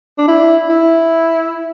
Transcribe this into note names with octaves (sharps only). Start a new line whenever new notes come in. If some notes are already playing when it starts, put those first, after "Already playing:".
D4
E4
E4